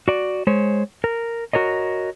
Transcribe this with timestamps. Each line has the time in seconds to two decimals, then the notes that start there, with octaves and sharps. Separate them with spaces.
0.08 F#4 D5
0.47 G#3 C5 C#5
1.04 A#4
1.53 F#4 A#4 C#5 D#5